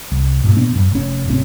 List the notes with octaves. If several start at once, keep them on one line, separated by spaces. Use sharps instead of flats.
C2
G2 A#2
A#2 B3 D4
D1 F#2
F1 C#4
D1 G#1 C3 C#4